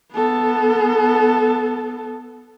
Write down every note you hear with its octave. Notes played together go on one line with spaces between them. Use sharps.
B3 A4